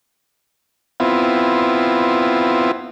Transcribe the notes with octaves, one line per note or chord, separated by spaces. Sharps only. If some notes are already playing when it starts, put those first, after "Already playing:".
B3 C4 E4 F4